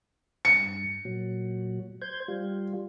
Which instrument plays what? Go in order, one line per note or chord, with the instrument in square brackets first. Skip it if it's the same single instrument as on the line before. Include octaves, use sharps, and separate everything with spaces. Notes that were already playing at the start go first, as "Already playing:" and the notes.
[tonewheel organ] G2 [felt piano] C#7
[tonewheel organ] A#2 F#3
C5 G6 G#6
G3 F4